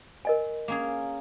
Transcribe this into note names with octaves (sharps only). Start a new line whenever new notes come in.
A#4 D#5 G#5
A#3 C#4 G#4